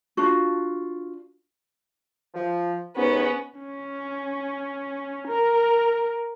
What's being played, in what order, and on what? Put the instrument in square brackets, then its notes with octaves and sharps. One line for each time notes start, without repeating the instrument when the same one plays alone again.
[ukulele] D4 F4 F#4
[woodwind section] F3
[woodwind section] D#2 G#2 [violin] B3 C#4
[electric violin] C#4
A#4